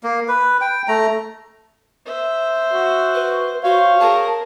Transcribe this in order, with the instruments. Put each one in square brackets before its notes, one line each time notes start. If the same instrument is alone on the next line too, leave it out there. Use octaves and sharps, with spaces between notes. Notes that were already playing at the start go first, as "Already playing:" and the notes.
[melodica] A#3
B4
G5
A3 A#5
[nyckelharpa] C5 E5
[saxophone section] F#4
[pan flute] B4
[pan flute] F#4 [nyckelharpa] C5 [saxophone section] C#5 F5
[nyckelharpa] G#4 A#4 [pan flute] A5